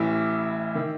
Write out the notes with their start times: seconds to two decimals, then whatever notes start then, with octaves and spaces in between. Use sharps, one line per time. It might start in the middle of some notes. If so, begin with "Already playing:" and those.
Already playing: A1 A2 E3 E4
0.75 D#3